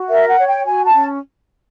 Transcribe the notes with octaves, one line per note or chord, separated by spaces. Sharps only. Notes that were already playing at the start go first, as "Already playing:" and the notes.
Already playing: F#4
A#4 E5
F#5
C#5
G5
F#4 G#5
A5
C#4